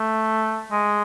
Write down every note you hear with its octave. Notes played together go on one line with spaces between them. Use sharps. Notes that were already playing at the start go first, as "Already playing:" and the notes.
Already playing: A3
G#3